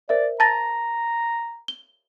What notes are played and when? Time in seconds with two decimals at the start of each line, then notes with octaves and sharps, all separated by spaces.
0.09 A#4 C5 D5 E5
0.40 A5 A#5 A6 A#6
1.68 G7